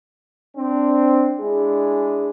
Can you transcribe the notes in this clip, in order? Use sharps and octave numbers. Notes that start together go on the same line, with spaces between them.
C4 D4
G#3 D4 E4 G#4